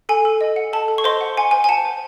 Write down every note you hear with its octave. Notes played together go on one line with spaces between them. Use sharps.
A4 G#5
A4
D#5
F#5
A4 A5
A4
C#6
C5 D#5 C6
F#5
F#5 G#5
C5 G#5
G#5
F#5 A5
C5